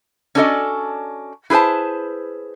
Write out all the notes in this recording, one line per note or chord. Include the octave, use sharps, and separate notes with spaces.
C#4 D4 F#4 A4 D5 D#5
E4 G#4 B4 C5 A5